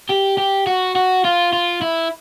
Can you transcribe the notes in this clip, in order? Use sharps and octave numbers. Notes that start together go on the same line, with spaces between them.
G4
G4
F#4
F#4
F4
F4
E4